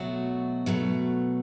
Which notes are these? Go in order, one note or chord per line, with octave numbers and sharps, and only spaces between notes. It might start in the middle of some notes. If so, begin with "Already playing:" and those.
Already playing: B2 F#3 A3 F#4
B2 F#3 A3